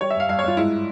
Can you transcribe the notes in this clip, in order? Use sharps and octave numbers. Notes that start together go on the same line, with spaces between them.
G3 C#5
E5
G2 F5
G2 F5
C#5
G2 F4
G#2 E4